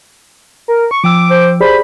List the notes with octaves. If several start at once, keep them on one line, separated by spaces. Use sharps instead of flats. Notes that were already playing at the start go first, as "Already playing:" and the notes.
A#4
C#6
F3 G5 D6 E6
C5
G4 G#4 C5 D5 B5